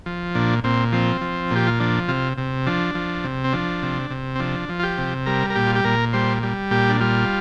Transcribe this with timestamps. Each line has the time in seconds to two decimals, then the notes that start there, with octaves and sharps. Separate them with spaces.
0.06 F3
0.35 A#2 D4
0.64 A#2 C4
0.92 F3 C4
1.21 F3
1.51 A#2 G4
1.67 F4
1.80 F3 D4
2.08 C3 F4
2.38 C3
2.66 F3 D4
2.95 F3
3.24 C3
3.44 C4
3.53 F3 D4
3.82 C3
4.10 C3
4.35 C4
4.39 F3 D4
4.69 F3
4.79 F4
4.83 G4
4.98 C3
5.26 G3 A#4
5.50 A#4
5.55 A#2 G4
5.67 F4
5.75 G4
5.84 A#2 A#4
6.13 G3 C5
6.43 G3
6.71 A#2 G4
6.89 D4
7.00 G3 F4